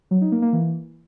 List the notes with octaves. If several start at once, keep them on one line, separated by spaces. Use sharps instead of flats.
F#3
D#4
A#3
A#3
E3